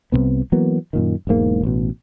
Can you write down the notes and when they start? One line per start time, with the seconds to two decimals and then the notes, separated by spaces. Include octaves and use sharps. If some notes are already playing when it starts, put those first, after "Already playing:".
0.12 C2 A2 C3 B3
0.52 E3 F#3 A#3 B3
0.93 F#2 A#2 D#3
1.27 E1 B1 G#2 A#3
1.63 A1 B2